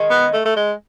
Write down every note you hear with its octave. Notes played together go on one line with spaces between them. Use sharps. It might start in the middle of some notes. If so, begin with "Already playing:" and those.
Already playing: D#3 G#3 C#4
B3
A3
A3
G#3